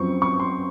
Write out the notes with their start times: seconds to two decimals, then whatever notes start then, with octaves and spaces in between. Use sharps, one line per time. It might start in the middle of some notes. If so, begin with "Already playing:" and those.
Already playing: F#2 F3 C4 C#6
0.22 C#6
0.40 C6